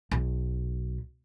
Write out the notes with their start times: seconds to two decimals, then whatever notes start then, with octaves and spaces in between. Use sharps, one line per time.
0.11 B1